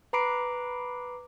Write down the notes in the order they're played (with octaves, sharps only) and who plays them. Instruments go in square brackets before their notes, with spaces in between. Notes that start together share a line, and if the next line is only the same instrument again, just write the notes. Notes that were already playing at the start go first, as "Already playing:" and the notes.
[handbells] B4 A#5 B5 D6 C7 D7